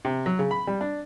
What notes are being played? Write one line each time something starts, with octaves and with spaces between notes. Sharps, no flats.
C3
F#3
C#3
B5
G3
D4